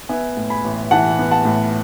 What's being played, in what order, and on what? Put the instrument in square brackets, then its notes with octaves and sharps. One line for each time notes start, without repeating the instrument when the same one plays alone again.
[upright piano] B3 E5 G#5
A2
G#5 B5
A1
E3 F#5 A5
B3
F#5 A5
A2